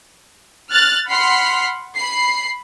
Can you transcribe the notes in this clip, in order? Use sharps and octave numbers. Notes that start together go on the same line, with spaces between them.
F6 F#6 A6
F#5 B5 C6 F6 B6 C7
B5 C7